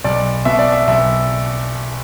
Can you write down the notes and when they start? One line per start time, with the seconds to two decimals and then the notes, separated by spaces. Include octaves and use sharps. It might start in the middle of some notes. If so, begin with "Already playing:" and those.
0.04 B1 D5
0.45 B2 E5
0.59 D5
0.72 E5
0.88 B1 E5